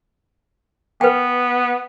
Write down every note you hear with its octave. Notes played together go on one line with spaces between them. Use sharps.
B3 B4 G5